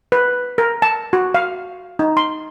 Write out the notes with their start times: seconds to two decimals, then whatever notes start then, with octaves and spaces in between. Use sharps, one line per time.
0.12 B4
0.58 A#4
0.82 A5
1.13 F#4
1.35 F5
1.99 D#4
2.17 C6